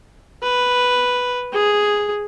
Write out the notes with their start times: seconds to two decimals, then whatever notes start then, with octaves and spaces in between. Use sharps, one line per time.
0.43 B4
1.53 G#4